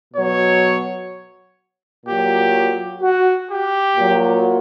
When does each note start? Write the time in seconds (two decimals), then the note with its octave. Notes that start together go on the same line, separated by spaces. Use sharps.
0.14 B2 F#3 C#5
2.06 A#2 F#3 G4
3.02 F#4
3.50 G4
3.97 A#2 F#3